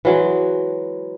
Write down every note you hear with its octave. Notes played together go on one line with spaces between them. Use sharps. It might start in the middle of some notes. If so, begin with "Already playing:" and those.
E3 F#3 G#3